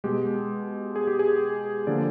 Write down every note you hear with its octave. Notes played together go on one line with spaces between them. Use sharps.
B2 G#3 G4
G#4
G4
G#4
D3 F3 A#3 D5